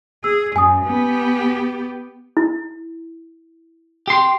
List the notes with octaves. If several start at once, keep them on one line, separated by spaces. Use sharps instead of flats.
G#4 E6
F#2 G#5 D#6
B3 G4
E4
G4 C6